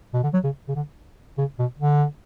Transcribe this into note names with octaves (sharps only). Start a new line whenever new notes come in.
B2
D3
F#3
C#3
C#3
D3
C#3
B2
D3